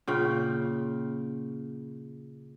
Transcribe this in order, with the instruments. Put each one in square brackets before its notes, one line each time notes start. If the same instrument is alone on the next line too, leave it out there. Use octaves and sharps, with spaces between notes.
[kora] A#2 C#3 G5